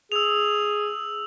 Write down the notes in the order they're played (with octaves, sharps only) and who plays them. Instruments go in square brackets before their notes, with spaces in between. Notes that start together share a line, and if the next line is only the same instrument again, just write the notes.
[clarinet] G#4 [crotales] E6 F7